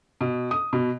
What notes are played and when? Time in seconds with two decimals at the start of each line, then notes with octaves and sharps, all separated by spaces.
0.21 B2
0.51 D#6
0.73 B2